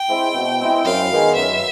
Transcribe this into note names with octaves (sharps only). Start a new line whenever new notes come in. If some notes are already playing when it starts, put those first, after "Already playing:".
Already playing: G5
G#3 C4 E4
B2
G#3 C4 E4
F#2 F5
D#3 G#3 B3
F#2 E5